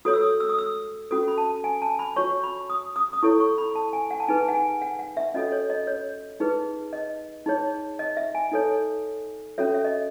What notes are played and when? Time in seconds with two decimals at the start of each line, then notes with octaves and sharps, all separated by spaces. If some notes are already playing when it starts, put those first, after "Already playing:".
0.05 F#4 A4 C#5 D#6
0.13 E6
0.21 D#6
0.40 E6
0.49 D#6
0.58 E6
1.11 C#4 F#4 A4 D#6
1.28 B5
1.38 A5
1.64 G#5
1.82 A5
1.99 B5
2.16 F#4 C#5 C#6
2.43 B5
2.70 D#6
2.96 D#6
3.13 D#6
3.22 E4 A4 C#5 C#6
3.40 C#6
3.58 B5
3.75 A5
3.93 G#5
4.11 F#5
4.20 A5
4.28 D#4 G#4 B4 G#5
4.48 F#5
4.55 G#5
4.82 F#5
4.99 F#5
5.17 E5
5.34 C#4 F#4 A4 C#5 D#5
5.52 C#5
5.70 D#5
5.87 C#5
6.40 D#4 G#4 B4
6.93 D#5
7.46 D#4 G#4 C#5
7.99 D#5
8.17 E5
8.35 G#5
8.52 D#4 A4 C#5
9.58 C#4 F#4 A4 C#5 E5
9.74 E5
9.85 D#5